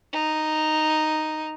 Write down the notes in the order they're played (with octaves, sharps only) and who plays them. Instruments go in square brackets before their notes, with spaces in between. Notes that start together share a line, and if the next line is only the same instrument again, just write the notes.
[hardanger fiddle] D#4